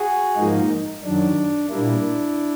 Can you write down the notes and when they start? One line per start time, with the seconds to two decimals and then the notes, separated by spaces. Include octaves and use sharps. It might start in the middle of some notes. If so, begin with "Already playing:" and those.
Already playing: F#4 G#4
0.37 G#2 F3 A#3 D#4
1.04 F#2 D#3 F#3 D4
1.70 A#2 G3 A#3 D4 E4